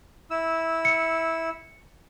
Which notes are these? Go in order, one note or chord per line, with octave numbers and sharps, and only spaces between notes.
E4 E6
C#7